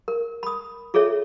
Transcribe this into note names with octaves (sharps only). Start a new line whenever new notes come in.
A#4
B5 D#6
F4 G#4 A4 C#5 E5